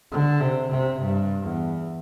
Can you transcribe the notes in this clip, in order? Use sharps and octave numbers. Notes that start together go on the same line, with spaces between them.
D3
C3
C3
G2
E2